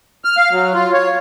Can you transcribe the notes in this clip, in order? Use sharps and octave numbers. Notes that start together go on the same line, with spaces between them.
F6
F5
F#3
F4
C#5